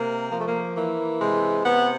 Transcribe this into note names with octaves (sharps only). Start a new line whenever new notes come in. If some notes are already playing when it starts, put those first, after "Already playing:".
Already playing: C3 A#3
F3 A#3
A3
A#3
E3 A#3
C3 G#3
C3 B3